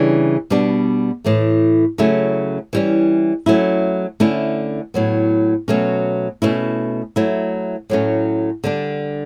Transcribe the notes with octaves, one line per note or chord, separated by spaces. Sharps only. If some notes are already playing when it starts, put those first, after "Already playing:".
Already playing: C#3 E3 G3 D4
B2 G3 B3 D4
A2 E3 A3
C#3 F#3 A3 C#4 E4
E3 G3 C#4
F#3 A3 C#4 E4
D3 A3 C#4 E4
A2 F#3 B3
B2 F#3 A3 C#4
B2 A3 C#4 E4
F#3 A3 E4
A2 F#3 A3 C#4
D3 G3 D4